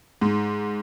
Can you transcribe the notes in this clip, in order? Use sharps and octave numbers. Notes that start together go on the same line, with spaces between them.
G#2